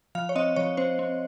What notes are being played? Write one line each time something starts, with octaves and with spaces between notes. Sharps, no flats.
F3 F5
C#5
C4 D#5
F3 C#5
C4 C5
C4